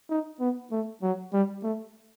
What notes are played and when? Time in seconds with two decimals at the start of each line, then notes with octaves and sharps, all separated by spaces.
0.10 D#4
0.40 B3
0.71 A3
1.02 F#3
1.33 G3
1.63 A3